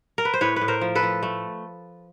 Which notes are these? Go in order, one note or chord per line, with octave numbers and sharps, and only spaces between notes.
A#4
B4
C5
A2 B4 C#5
B4
A2
A#4 C5
F3
A4 B4
F3
A3